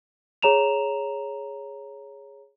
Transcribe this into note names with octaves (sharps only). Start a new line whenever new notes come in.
G#4 C#5 A#5 E7 F7